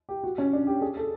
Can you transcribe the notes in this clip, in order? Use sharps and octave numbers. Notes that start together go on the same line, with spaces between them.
G4
F#4
C#4
D4
G4
G#4
A4